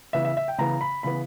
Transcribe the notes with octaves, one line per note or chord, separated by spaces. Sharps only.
C#3 E3 B3 E5
E5
E5
G5
C#3 E3 B3 A#5
B5
C#3 E3 B3 B5